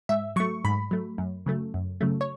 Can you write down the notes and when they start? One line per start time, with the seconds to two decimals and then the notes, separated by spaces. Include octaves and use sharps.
0.09 G#2 E5
0.36 F#3 A3 C#6
0.65 G#2 B5
0.91 F#3 A3
1.18 F#2
1.46 C#3 F#3 A3
1.74 F#2
2.01 C#3 F#3 A3
2.21 C#5